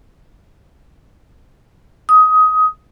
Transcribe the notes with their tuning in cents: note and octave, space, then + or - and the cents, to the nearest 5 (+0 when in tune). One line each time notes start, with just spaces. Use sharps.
D#6 +20